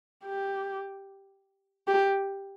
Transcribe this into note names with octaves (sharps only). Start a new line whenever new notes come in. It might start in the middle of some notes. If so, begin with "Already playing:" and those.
G4
G4